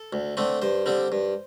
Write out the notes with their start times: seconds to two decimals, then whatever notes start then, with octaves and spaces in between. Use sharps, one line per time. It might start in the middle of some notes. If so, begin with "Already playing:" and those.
Already playing: A4
0.13 D2
0.37 D3 A3 C4
0.62 G2 C5
0.86 D3 G3 C4
1.12 G2